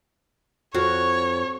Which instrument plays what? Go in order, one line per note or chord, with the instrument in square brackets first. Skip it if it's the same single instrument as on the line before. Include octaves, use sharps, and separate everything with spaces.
[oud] F2 [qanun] F#4 [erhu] C#5